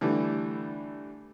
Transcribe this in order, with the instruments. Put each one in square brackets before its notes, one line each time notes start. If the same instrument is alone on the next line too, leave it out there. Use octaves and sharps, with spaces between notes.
[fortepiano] D3 E3 G3 A3